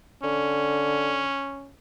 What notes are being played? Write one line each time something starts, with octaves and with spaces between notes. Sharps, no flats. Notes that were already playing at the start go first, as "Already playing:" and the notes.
D3 C#4